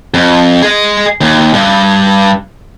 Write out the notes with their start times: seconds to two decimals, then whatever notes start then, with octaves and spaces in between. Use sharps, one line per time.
0.14 F2
0.62 G#4 D#5
1.21 D#2
1.54 G2